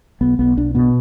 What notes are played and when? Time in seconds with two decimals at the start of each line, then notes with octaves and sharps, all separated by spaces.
0.21 B1 B3
0.39 B1 B3
0.57 B1 D4
0.75 B2 B3